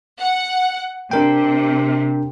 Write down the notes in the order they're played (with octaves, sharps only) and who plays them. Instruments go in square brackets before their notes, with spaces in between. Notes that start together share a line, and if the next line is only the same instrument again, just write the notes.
[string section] F#5
[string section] C3 [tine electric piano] D4 A#4 G5